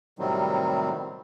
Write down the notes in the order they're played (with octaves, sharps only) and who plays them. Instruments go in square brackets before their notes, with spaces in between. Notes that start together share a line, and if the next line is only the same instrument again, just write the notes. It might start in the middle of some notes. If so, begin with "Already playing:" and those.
[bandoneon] A2 C3 D#3 F#3 G3 C4